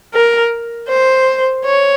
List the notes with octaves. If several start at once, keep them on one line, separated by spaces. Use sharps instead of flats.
A#4
C5
C#5